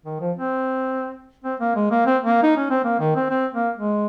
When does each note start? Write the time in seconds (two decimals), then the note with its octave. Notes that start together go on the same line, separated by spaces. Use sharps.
0.05 D#3
0.20 F3
0.36 C4
1.44 C4
1.60 A#3
1.76 G#3
1.91 A#3
2.06 C4
2.22 A#3
2.43 D#4
2.57 C#4
2.70 C4
2.84 A#3
3.00 D#3
3.16 C4
3.30 C4
3.53 A#3
3.77 G#3